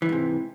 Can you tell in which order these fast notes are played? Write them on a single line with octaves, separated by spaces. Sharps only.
E3 D#3 G#2 C3